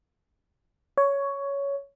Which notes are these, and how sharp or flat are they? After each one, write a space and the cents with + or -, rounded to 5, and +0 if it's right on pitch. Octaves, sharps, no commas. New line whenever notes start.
C#5 +10